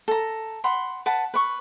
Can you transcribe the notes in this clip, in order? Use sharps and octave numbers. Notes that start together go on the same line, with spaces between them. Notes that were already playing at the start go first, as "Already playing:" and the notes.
A4 A#5
F#5 B5 C6
B4 F#5 A5
B4 C#6